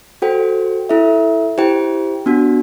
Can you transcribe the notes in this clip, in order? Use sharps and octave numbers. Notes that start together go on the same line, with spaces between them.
F#4 A4 C5 G5
E4 A4 E5
E4 G4 C5 G5
B3 D4 F#4